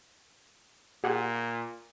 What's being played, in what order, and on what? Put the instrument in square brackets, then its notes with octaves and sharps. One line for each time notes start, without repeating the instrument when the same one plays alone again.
[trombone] A#2 [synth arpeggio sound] G4 G#4 F#5